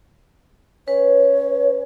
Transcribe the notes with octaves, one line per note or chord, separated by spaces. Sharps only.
C#4 B4 C#5